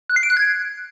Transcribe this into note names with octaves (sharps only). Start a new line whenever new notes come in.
F#6
C7
D7
F#6
G#6